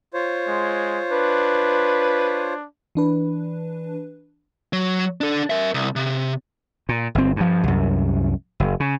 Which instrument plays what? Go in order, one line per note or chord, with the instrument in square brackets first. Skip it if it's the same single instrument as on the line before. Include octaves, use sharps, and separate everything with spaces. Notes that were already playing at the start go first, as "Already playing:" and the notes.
[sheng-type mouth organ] F4 C5 C#5
[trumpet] G#3
[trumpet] D4 [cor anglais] B4
[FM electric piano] E3 D4 B4
[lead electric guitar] F#3
D4 A4
A#4 E5
C2
C3
[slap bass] A#2
G1 C4
G2 F3
C2 F#2
F#1
C#3